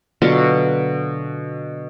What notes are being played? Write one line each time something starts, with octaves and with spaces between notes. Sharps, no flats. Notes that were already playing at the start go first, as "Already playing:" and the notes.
B2 D3 F#3 F4